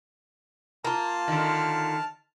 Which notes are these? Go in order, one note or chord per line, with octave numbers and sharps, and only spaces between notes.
A#3 F4 A5 F6
D3 D#3